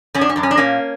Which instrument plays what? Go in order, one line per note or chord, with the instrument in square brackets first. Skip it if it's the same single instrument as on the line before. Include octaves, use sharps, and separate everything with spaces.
[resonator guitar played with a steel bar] F#2 C#4
D4
C#4
F#2 D4
C#4
D4
A#2 A#3 C#4